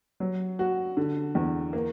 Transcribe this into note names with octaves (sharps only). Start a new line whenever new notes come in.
F#3
F#4
D3
E2
A#3